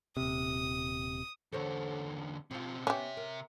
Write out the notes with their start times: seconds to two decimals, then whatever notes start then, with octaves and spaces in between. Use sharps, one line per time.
0.17 D#1 C3 D#6
1.52 E2 D3 A4 C5 C#5
2.51 B2 F3 C4 F4
2.87 C3 B3 C#4 D#4 G4 B4 E5
3.17 A#4